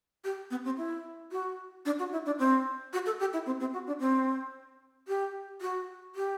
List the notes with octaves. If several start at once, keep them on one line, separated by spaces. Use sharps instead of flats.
G4
B3
C4
E4
F#4
D4
F#4
E4
D4
C4
F#4
A4
G4
E4
C4
C4
F#4
D4
C4
G4
F#4
G4